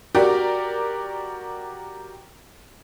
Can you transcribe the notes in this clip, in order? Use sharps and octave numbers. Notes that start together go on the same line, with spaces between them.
F#4 G4 A#4 D5